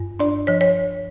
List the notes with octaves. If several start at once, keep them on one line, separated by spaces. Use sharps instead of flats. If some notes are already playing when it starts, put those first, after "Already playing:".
Already playing: G2
D4 D5
F3 C#5
C#5